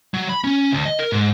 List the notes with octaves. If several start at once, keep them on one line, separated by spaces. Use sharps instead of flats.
F#3
B5
C#4
D2
D#5
A#4
G#2